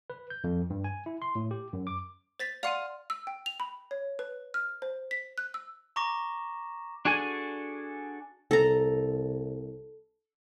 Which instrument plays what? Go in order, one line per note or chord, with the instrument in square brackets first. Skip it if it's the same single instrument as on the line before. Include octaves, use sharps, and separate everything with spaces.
[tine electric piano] B4
G6
F2
G2
G#5
E4
C6
A2
G4
F#2
D6
[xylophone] C5 A6 B6
[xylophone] D5 F#5 D#7 [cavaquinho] F5 C6
[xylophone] E6
G5
F7
B5
C#5
B4
F6
C5
B6
F#6
E6
[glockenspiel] A#5 C#6 D6 A#6 E7
[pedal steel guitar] D4 F#4 G#4 A4 G#5
[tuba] C2 [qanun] A4 A#5